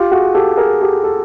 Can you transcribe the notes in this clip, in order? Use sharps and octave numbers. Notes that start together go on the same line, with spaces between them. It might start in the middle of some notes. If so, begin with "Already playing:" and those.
Already playing: F4 G4
F#4 G#4
G4 A4
G#4 A#4
G4 A4
A4